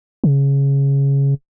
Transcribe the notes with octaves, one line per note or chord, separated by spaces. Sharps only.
C#3